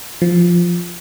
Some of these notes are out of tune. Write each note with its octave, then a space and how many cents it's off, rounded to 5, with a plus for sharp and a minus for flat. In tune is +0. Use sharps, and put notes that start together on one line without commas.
F3 +0